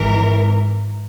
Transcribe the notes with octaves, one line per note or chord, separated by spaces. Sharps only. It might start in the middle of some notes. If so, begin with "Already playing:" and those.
Already playing: G#1 G#2 E3 A#4